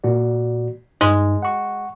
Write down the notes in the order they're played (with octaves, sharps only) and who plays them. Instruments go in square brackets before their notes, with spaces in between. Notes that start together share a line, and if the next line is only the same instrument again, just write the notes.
[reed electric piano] A#2 F#4 D5
[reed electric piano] G2 D#4 [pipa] G#3
[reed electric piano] F#5 C#6